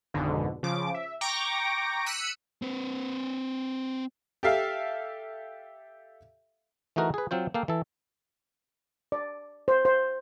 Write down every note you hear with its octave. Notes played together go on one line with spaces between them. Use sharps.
G#1 F2 G#2 B2 D3
C#3 F3 D6
E5
G5 A#5 C#6 D6 A#6 D7
E6 F#6 B6 C#7 D#7
C4 B4
G4 A4 E5 F5
E3 A3 D#4 F#4 A#4
G#4 B4
F#3 C4 F4 C5
A#3 A4 F5 G5
E3 A4
D5
C5
C5